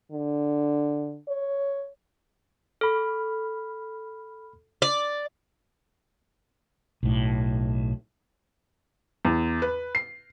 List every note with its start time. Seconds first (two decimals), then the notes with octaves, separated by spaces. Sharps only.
0.12 D3
1.28 C#5
2.81 A4 B5 F6
4.82 D5
7.03 B1 A2
9.25 E2
9.62 B4
9.95 C7